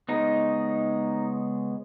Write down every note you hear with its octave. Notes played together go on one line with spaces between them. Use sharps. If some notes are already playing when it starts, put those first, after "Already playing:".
C#3 G#3 B3 D#4